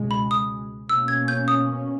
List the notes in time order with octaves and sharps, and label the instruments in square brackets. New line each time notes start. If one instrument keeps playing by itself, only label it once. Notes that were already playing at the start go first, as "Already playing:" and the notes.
Already playing: [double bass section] C#2 B2 G#3
[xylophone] B5
D#6
[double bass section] B2 A#3 C#4 [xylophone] E6
[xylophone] G#6
G6
D#6